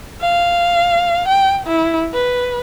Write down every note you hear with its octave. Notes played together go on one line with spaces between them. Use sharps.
F5
G5
E4
B4